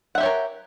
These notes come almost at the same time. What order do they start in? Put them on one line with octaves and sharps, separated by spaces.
F#5 E5 G4 C#5 A#4